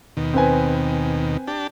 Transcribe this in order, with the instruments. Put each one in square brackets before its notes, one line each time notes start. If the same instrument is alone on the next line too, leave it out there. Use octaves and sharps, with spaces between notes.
[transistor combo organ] D#2 B2 D#3
[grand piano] C4 B4 G#5
[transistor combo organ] D4 G4 A5